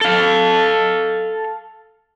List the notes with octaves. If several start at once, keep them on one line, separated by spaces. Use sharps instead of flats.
A4 F5